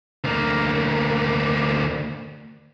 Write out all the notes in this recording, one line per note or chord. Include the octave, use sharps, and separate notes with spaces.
D2 A#3